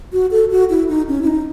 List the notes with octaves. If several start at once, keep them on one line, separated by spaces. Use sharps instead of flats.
F#4
A4
F#4
E4
D#4
C#4
E4
D#4